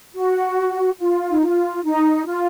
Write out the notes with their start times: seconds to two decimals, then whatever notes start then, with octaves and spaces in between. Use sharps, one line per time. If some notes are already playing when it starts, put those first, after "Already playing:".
0.14 F#4
0.99 F4
1.30 D#4
1.42 F4
1.85 D#4
2.26 F4